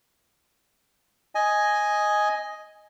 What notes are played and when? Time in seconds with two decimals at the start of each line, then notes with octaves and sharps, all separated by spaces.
1.35 D#5 G#5